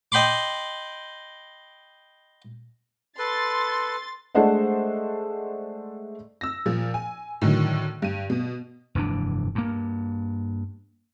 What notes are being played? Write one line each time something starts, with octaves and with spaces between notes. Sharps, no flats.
D#5 G5 B5 C6 D6
A4 B4 C6 A6
G#3 A3 D4 C5 D#5 F#5
E6 A#6
A#2 F3
G#5
A2 D3 D#3 F#3
G2 D#7
B2
F1 G2 E3 D4
G2 A#3